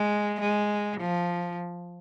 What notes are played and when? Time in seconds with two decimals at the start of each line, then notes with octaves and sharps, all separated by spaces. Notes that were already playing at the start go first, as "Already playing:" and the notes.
Already playing: G#3
0.41 G#3
1.00 F3